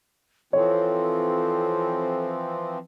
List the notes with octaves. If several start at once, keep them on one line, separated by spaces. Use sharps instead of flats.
E3 F3 C4 A4 C#5